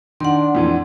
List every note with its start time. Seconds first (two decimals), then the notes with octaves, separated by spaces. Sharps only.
0.20 D#3 D4 F#5 C6
0.55 F2 A2 E3